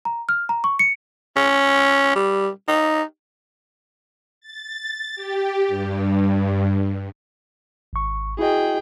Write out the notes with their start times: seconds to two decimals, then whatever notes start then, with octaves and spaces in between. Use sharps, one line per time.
0.05 A#5
0.29 F6
0.49 A#5
0.64 C#6
0.79 C#7
1.37 C#4
2.16 G3
2.68 D#4
4.41 A6
5.16 G4
5.68 G2
7.93 G#1 C#6
8.39 E4 F#4 G#4 D#5 G5